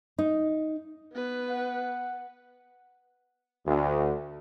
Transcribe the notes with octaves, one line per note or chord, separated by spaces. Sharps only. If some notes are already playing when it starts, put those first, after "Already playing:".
D#4
B3 B4
F#5
D2